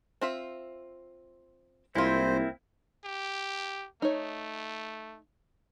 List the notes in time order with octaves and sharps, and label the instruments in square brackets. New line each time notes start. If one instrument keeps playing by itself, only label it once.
[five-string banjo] C4 F4 E5
[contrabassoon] C2 [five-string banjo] G#3 F4 [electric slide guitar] A#3 C4 E4 [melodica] C5
[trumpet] G4
[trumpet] A3 [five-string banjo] D#4 C#5